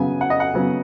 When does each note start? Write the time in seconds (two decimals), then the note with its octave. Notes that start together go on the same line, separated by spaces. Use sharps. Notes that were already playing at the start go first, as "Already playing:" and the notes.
Already playing: C#3 F#3 B3 G#5
0.21 F#5
0.30 D#5
0.40 F#5
0.54 C#3 F#3 B3